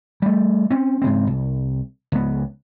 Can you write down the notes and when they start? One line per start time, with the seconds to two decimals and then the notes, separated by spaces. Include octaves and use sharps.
0.22 G3 A3
0.71 C4 C#4
1.02 G#2 C#3 C4
1.27 C2
2.12 C#2 B3